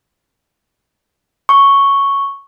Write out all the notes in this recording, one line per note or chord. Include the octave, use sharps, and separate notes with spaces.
C#6